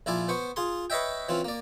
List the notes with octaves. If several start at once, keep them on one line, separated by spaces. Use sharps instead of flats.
A#1 E4 F4 D5 G#5
B3 C5 C#6
F4 G#4 C6
B4 C#5 D#5 E5 G5
E3 C4 C#4 F4
A#3 D5